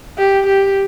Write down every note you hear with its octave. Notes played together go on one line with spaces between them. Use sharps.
G4
G4